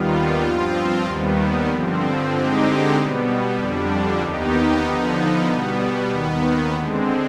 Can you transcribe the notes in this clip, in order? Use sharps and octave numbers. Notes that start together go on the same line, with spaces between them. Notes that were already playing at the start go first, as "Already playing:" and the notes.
Already playing: D#2 D#3 G3 B3 F4
G2 F3 C4 F4
D#2 D#3 G3 B3
G2 D3 F3 C4
D3 G#3 C4 D#4 G4
B2 G3 B3
F2 D3 G3 D4
D#2 D#3 B3 D#4 G4
D3 F3 B3 D#4
B2 G3 B3
D#2 D#3 B3
D3 G#3 C4